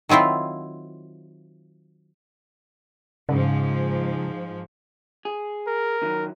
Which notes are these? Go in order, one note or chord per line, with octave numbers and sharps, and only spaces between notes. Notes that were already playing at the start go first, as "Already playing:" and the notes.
D#3 F#3 C4 E4 F4
G#2 C#3 F3
G#4
A#4
D#3 F#3